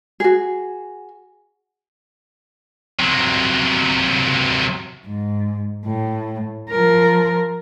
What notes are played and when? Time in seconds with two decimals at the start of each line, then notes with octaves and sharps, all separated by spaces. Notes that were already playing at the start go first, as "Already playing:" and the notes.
0.20 F#4 G#4
2.99 C3 F#3
5.06 G#2
5.85 A2
6.71 F3 A#4